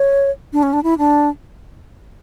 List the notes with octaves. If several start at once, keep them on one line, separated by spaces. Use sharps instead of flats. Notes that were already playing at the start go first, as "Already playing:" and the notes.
Already playing: C#5
D4
C#4
D4
E4
D4